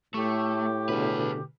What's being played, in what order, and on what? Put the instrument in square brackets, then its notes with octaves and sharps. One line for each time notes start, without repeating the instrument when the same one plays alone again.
[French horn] A2 [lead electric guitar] A3 [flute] G4 [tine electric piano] C#6
[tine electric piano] B2 D3 [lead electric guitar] G#4 B4